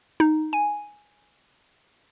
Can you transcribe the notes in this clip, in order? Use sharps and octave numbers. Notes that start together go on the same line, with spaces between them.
D#4
G#5